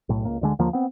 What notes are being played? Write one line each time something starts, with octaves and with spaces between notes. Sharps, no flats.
B1 A2
C#2 A#3
D2 D3 G#3
D#2 D3 F3 A#3
B3 C4